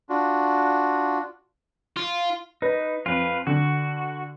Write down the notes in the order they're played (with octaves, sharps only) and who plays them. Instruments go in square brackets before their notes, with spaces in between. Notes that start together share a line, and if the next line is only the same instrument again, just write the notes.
[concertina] D4 F4 F#4
[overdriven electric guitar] F4
[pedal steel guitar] D#4 [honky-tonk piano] B4
[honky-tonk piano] F2 [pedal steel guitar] F4 B4
[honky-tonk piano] D3 [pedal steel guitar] F#4